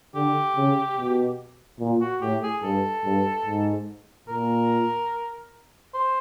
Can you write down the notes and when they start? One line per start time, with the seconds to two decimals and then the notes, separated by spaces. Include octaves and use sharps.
0.15 D3 G4
0.57 C#3
0.98 B2
1.80 A#2
2.01 F#4
2.22 A2 G4
2.43 G#4
2.63 G2 A4
3.05 G2
3.46 G#2
4.28 A#2 A#4
5.94 C5